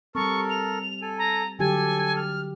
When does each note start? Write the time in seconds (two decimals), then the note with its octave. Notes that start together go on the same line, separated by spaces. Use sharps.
0.15 G3 C4 A4 A#4 C#6
0.50 F7
1.02 A4 G#5
1.18 A#5
1.59 D3 F#3 G4 A4 G#5
2.16 F6